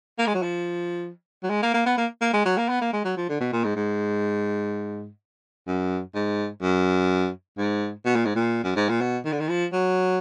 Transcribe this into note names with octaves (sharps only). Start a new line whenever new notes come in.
A#3
G#3
F#3
F3
F#3
G#3
A#3
A#3
B3
A#3
A#3
G#3
F#3
A#3
B3
A#3
G#3
F#3
F3
D3
B2
A#2
G#2
G#2
F#2
G#2
F#2
G#2
B2
A#2
G#2
A#2
F#2
G#2
A#2
B2
D#3
D3
D#3
F3
F#3